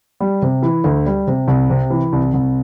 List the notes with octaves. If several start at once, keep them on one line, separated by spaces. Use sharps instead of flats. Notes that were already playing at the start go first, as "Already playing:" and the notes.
G3
C3
E3
D2
G3
C3
C2
C3
E3
C2
C2